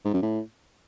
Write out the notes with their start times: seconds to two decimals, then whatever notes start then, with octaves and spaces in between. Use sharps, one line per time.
0.05 G#2
0.14 F#2
0.22 A2